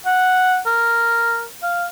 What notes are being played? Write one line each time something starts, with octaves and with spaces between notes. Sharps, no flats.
F#5
A#4
F5